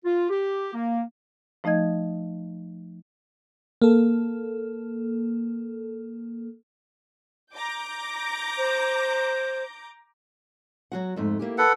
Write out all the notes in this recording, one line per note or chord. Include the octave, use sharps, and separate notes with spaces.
F4
G4
A#3
F3 A3 D#4 D#5 G#6
A#3 A4
A#5 D6 G6
C5
F#3 F#4 F#5
F2 G#2 A3
A#3 E4 G4
A4 B4 F#5